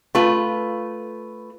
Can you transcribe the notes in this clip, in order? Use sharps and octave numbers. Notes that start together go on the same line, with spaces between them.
A3 F4 B4